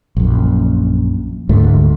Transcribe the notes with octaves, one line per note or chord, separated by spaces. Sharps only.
A#1 F#2
D2 G#2 A3